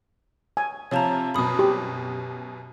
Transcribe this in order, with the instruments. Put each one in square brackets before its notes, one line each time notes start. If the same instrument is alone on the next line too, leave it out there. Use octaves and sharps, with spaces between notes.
[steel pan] G#5
[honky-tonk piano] C3 F3 [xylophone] C#5 A5 A#5
[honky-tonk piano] F#2 B2 [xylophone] B5 D#6
[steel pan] G4